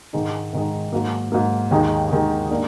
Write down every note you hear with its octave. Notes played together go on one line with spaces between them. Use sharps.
G#2 D#3 G#3 D#4
G#2 D#3 G#3 D#4
G#2 F#3 A#3
G#2 F#3 A#3
D#2 D#3 G#3 D#4
D#2 D#3 G#3 D#4
A#3 D4